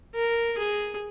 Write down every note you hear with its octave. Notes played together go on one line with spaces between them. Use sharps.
A#4
G#4